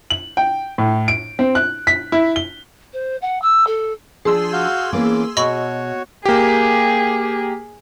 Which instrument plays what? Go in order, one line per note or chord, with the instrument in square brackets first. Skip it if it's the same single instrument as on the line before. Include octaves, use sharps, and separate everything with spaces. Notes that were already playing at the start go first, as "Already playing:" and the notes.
[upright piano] F#7
G5
A2
D7
C4
F#6
B6
E4
G7
[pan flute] C5
F#5
E6
A4
[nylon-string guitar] F3 D4 [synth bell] G#4 C6 E6
[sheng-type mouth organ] F#4 F5 G6
[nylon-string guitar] E3 A#3 B3 [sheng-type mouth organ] C#4 D6
[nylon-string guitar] B2 [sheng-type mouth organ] F#4 C#5 [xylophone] D#5 B5 C#6
[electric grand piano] A#3 G4 [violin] G#4